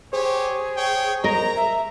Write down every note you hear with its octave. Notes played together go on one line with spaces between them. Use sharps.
G4 G#4 C5 C#5
C#5 G5
A#4 D#5 A#5
E5